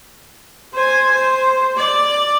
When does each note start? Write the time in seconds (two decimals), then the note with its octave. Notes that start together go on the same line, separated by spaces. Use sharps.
0.74 C5 G#5
1.14 C5
1.77 D5